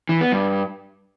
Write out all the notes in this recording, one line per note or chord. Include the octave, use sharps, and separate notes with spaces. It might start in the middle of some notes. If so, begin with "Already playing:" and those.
E3
B3
G2